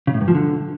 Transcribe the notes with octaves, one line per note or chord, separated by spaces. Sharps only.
C#3
A2
G2
F3
D3